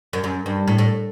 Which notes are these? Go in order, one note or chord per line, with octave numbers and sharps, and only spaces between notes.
F#2
F#2
G2
A2
A2